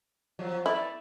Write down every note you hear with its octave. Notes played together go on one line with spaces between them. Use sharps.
E2 F3 F#3
A3 B3 E4 D5